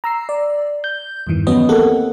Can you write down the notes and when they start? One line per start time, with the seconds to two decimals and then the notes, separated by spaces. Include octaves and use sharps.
0.04 A#5 E6 C7
0.29 D5
0.84 G6
1.27 E2 G2 D#3 E3
1.47 F#3 B3 C#4 B4 D#5
1.69 A#3 C4 G4 A4 F#5